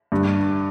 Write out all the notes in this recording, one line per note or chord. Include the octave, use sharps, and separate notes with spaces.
G2